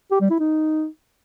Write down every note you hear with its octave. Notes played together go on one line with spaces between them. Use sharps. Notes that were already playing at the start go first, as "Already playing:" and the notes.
G4
G3
E4
D#4